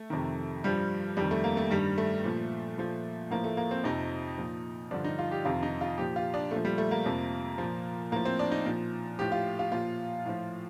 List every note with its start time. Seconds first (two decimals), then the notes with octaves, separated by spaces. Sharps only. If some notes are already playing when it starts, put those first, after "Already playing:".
Already playing: A3
0.10 F2 C3 D#3
0.64 G2 F3 G3
1.17 F2 D#3 G3
1.31 A3
1.44 A#3
1.57 A3
1.71 G2 D#3 G3
1.98 A3
2.24 A#2 F3
2.78 A#2 F3
3.30 A2 F3 A#3
3.44 A3
3.57 A#3
3.71 C4
3.84 F2 C3 F3 D#4
4.38 A#2 F3
4.91 G2 D3 F3 D4
5.04 D#4
5.19 F4
5.31 G4
5.45 F2 C3 D#3 F4
5.63 D#4
5.81 F4
5.98 A#2 F3 G4
6.16 F4
6.34 D4
6.51 A#2 F3 A3
6.65 G3
6.78 A3
6.91 A#3
7.05 F2 C3 F3
7.58 A#2 F3
8.11 A2 F3 A#3
8.25 C4
8.39 D4
8.52 D#4
8.66 A#2 F3
9.19 A2 F3 G4
9.32 F4
9.59 F4
9.72 A#2 F3 F4
10.26 A2 F3